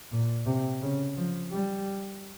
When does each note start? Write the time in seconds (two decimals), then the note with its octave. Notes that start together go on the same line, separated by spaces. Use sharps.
0.12 A#2
0.46 C3
0.82 C#3
1.17 F3
1.52 G3